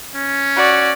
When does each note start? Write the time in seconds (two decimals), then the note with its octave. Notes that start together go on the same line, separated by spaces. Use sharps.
0.15 C#4
0.56 F#4 D5